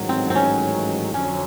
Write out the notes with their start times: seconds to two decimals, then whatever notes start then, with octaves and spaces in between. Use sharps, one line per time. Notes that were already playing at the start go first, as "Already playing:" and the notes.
Already playing: A1 G#2 D#3 F#3
0.09 C4
0.30 C4
0.35 C#4
1.14 F2 D3 F#3 C#4